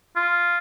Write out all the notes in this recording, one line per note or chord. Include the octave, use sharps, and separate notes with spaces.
F4